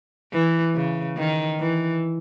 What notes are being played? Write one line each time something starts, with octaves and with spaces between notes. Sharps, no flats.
E3
C#3
D#3
E3